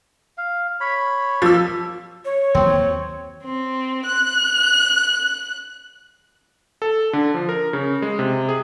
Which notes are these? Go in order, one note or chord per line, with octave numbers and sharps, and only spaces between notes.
F5
C#5 B5
F3 A#3 A4 E6
C#5
D#2 F#3 C4
C4
F#6
A4
D3
F3
A#4
C#3
G#3
C3
G#4